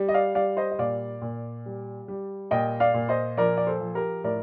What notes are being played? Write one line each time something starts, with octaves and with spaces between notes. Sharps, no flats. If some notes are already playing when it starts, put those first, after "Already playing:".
Already playing: G3
D#5
D5 F5
G3 D5 F5
C5 D#5
D#5
A#2 D5 F5
A#2
G3
G3
A#2 D#5 G5
D5 F5
A#2
C5 D#5
F3 A#4 D5
D5
A4 C5
F3
G4 A#4
A2 A#4 D5